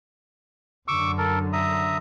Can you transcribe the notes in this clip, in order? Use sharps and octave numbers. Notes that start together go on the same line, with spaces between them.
F#2 D3 C#6 D6 E6
A4 A#4
E5 A#5 D#6